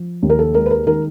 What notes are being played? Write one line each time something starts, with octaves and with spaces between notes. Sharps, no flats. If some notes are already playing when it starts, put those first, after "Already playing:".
Already playing: F3
D#2
A#4
A4
G#3 A#4
B4
A#4
D#3 A#4